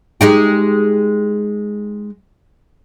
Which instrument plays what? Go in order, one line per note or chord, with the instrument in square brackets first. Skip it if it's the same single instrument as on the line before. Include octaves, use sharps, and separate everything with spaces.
[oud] G#3 D#4 G4